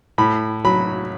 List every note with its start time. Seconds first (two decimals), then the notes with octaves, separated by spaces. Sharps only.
0.18 A2 B5
0.65 F#3 B5